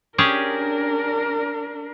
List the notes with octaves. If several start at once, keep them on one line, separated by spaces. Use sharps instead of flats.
C#4 D4 G4 G#4 A#4